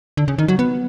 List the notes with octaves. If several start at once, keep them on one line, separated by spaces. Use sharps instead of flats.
D3
C#3
D#3
F#3
B3